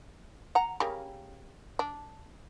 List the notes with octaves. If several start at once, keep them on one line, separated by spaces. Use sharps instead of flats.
F#5 A#5
C#3 G3 A#3
D4